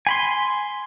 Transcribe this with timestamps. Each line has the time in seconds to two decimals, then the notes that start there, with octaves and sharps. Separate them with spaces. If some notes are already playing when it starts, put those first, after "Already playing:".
0.07 G#5 B5 C6